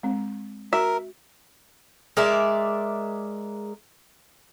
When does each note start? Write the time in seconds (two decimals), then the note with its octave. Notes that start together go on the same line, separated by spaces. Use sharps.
0.03 G#3 C4
0.73 F#4 A#4 E5
2.17 G#3 A#4 D5 E5